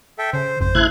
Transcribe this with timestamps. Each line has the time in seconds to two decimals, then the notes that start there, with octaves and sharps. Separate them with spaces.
0.18 A4 E5 G5
0.33 C#3 C5
0.61 G#1 F2 C5
0.75 C#3 A3 E4 F#6 G#6